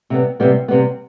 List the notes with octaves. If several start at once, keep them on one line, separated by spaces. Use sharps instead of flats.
C3 G3 B3
C3 G3 B3
C3 G3 B3